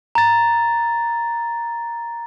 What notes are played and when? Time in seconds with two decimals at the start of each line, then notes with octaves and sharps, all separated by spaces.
0.15 A#5 A6